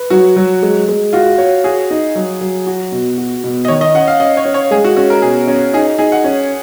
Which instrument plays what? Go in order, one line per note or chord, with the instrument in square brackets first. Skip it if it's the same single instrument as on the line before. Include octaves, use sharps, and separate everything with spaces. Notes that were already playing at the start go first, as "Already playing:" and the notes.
Already playing: [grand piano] B4
[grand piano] F#3 [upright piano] F#4
[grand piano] F#3
G#3
G#3
[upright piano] F4 [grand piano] F#4
[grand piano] C#5
[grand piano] F#4 [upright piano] G#4
[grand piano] D#4
F#3
F#3
F#4
B2
F#4
B2
[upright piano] D#5
[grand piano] D#3 [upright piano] C#5
[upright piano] D#5
[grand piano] C#4 [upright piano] F#5
[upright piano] F5
[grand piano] C#4 [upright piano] D#5
[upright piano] C#5
[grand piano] C#4
[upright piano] C#5
[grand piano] G#3 [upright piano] G#4
[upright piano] F#4
[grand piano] C#4 [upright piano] F#4
[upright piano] A#4
[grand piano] B2 [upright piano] G#4
[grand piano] C#4
[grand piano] D#4 [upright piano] G#4
[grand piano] D#4 [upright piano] G#4
[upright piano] F#5
[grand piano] C#4